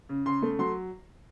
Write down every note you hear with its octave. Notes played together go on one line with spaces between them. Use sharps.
C#3
C#3 C6
A3
F#3 C6